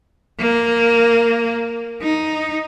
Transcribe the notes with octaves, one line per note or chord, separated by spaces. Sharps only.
A#3
D#4